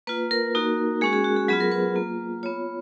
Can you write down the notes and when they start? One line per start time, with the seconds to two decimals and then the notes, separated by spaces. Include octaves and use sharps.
0.07 A#3 F4 B4
0.31 A#4
0.55 A#3 D#4 F#4
1.01 G#3 C#4 F#4 G#4
1.13 G#4
1.24 F#4
1.36 G#4
1.48 F#3 B3 F4 G#4
1.60 A#4
1.72 B4
1.96 A#3 F4
2.43 B3 F4 C#5